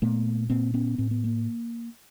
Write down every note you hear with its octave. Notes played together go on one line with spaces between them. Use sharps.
A#2 A3 B3
A#2 A#3 C4
B3 C#4
A2 C4
B3
A#3